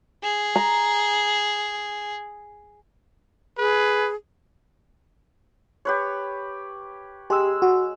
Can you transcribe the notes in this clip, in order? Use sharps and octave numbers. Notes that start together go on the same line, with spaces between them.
G#4
A#5
G#4 B4
G4 B4 C#5
G#3 G4 E6
F#4